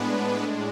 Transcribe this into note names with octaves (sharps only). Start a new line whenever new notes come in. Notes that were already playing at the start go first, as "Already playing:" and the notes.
Already playing: A2 G#3 B3 D4 B4